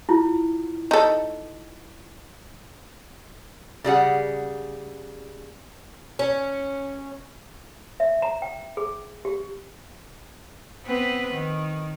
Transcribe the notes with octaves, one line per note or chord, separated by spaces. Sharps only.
E4 F4
D#4 A4
C#3 G3 G#4 F#5
C#4
E5
A#5
G5
G#4
G4
B3 C4 B4
D#3